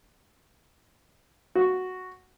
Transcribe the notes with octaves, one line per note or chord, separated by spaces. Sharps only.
F#4